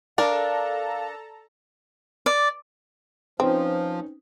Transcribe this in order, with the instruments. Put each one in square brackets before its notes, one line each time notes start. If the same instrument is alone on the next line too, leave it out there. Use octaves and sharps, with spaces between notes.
[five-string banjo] D4 A#4 [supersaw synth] A4 A5 A#5 [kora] D5 [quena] F5
[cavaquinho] D5
[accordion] F3 [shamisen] C4 [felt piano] C#4 D#4 B4